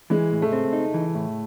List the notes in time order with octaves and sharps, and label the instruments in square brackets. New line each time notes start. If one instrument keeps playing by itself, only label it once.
[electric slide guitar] E3 [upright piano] G#3
[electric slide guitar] A2
[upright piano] A3
[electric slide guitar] C4
D#4
E3
A2